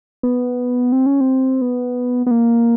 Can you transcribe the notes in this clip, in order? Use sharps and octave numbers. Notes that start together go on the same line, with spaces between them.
B3
C4
C#4
C4
B3
B3
A#3